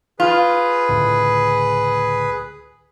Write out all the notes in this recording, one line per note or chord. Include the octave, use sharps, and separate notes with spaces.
F4 G#4 B4
C#2 A2 D3